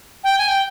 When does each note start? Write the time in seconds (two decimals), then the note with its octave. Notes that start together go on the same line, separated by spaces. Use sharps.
0.24 G5
0.38 G#5
0.48 G5